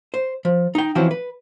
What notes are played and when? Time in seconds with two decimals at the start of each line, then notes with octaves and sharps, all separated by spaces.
0.14 C5
0.45 F3
0.75 D#4 G5
0.95 E3 F3 C4 C#4 E4 F#4
1.11 B4